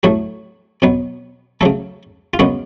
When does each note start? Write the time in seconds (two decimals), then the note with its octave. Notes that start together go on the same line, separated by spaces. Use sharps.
0.03 A2 F#3 A3 F#4
0.82 B2 F#3 B3
1.61 C#3 F#3 A3 A4
2.34 F4
2.39 F#2 C#3 G#3 B3 F#4